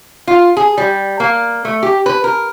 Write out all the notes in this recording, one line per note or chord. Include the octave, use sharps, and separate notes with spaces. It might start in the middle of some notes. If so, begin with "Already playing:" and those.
F4
G#4
G3
A#3
A3
G4
B4
A#4